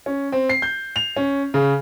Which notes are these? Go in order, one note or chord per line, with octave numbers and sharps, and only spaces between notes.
C#4
C4
C7
G6
F7
C#4
C#3